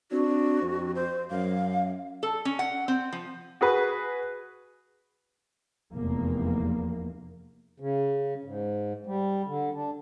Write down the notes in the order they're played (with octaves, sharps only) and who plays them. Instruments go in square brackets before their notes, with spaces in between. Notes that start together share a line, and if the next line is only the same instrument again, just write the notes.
[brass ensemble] C4 D4 [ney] F#4
[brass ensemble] F2
[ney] C5
[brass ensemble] F#2 [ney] F5
[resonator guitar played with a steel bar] A4
C#4
F#5
C4
F3
[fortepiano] F#4 G#4 B4
[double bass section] F1 E2 A#3
[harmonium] C#3
G#2
G3
D3
D4